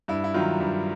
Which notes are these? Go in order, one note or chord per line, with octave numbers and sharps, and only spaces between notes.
G2 E4
E4
D#3 F#3 F4
G2